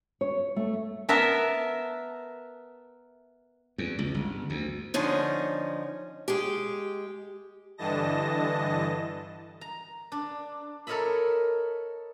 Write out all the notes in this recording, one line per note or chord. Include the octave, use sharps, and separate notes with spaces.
C#5
A3
B3 A#4 E5 A5
E2
C#2
G1
D2
D3 F3 C#4 D#4
G#3 G4
G2 D3 E3 D#5 A5 A#6
A#5
D4
A4 A#4 C#5 D#5 E5 B5